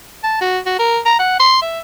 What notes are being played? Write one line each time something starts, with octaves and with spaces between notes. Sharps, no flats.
A5
F#4
F#4
A#4
A#5
F#5
C6
E5